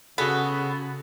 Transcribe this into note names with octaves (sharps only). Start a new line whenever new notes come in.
C#3 B3 F#4 G#4 A4